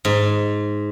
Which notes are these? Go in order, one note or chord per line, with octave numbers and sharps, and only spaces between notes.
G#2